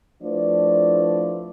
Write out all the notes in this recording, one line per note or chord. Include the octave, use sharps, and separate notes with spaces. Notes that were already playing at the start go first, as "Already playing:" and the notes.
F3 A3 D4 E4 B4 D5